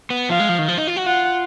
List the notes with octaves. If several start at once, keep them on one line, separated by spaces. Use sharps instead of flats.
B3
F3 F5
G#3
F3
D#3
F3
D#4
F4
F#4
F4 F#5